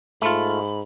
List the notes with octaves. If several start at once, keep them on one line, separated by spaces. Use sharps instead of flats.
G#2 A3 F4 B5